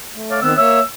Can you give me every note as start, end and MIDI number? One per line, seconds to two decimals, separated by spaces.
0.14 0.39 57
0.31 0.38 73
0.31 0.38 74
0.31 0.38 77
0.42 0.53 51
0.42 0.53 59
0.42 0.53 60
0.42 0.53 88
0.58 0.80 58
0.58 0.80 73
0.58 0.80 76
0.58 0.83 88